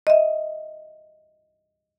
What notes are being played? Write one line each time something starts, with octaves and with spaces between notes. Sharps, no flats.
D#5 E5